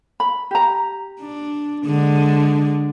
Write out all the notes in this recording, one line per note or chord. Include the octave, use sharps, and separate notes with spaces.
B5
G4 A#5
D4
D3 G#3